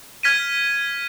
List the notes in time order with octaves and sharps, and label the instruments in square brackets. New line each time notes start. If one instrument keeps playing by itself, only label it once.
[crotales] F6 G#6 B6 D#7